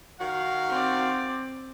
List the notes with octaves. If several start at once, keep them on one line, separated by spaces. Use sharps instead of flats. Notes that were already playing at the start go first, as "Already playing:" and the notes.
D#3 F#4 F5
C4 D5